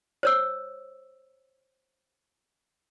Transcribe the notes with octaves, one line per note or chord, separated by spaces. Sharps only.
C5 C#5 E6